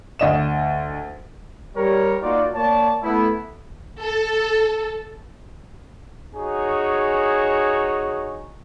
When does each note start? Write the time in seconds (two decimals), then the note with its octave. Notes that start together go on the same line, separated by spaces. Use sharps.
0.19 D2 D#5 E7
1.76 G3 A#4 C#5
2.22 A#3 D#4 F4 F#4 D5
2.54 A#3 C#5 D5 A5
3.02 A3 B3 E4
4.00 A4
6.35 D#4 F#4 G#4 C#5